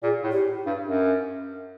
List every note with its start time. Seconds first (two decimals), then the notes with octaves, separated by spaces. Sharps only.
0.03 A#2 G#4
0.24 A2
0.31 G4
0.66 G2
0.87 F#2